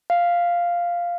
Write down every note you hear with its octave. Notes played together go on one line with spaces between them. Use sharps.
F5